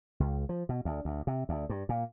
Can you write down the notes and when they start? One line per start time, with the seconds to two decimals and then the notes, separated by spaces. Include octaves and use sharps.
0.20 C#2
0.49 F3
0.69 B2
0.85 D2
1.05 D2
1.27 C3
1.49 D2
1.69 G2
1.89 A#2